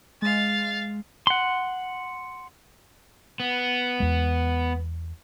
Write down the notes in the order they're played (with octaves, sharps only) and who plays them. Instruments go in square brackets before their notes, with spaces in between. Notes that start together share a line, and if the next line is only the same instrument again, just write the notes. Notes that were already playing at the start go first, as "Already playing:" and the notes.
[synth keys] G#3 [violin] F5 A6
[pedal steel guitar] F#5 C6
[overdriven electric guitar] B3
[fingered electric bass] E2 G#3